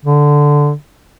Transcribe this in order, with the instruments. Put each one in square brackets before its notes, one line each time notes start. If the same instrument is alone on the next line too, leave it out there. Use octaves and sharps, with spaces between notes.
[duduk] D3